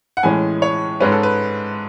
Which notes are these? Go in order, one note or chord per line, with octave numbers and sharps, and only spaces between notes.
F#5
A2 E3 G#3 C#4 G#5
C#5
G#2 G#3 C#4 B4
A4
B4